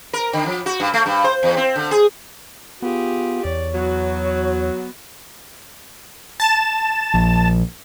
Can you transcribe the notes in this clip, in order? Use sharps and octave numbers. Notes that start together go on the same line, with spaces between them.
A#4
D3
F3
F#4
G2
A3
G2
C5
E2
C4
D3
G#4
B3 F4 G4 G#4
E2 C#5 D5
F#3 B3 F#4
A5 A6 E7
A#1